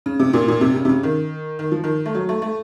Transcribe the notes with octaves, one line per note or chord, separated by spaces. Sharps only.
C#3
C3
A#2
A#2
C3
C#3
C3
C#3
D#3
D#3
F3
D#3
A3
F#3
A3
A3